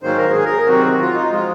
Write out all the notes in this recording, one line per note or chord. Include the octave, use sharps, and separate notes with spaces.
G#2 D#3 F#3 A#3 C5
A#4
G#4
A#4
C3 D#3 F#3 C4 F#4
F4
D#4
F3 G#3 F4